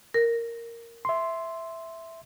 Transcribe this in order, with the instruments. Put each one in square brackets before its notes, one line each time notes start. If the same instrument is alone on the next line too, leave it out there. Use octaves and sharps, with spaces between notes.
[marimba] A#4
[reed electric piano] E5 C6